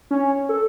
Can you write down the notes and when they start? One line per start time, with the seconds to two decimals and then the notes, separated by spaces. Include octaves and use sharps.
0.11 C#4
0.49 A4